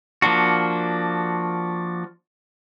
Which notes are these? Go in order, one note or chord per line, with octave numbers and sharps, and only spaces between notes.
F3 A#3 D4 F#4